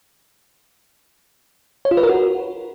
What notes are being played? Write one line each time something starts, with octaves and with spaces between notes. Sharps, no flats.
C#5
F4
B4
A#4
F#4